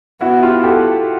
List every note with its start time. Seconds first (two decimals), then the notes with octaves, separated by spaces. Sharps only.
0.21 B3 E4 F#4
0.43 F4 G4
0.64 G4 A4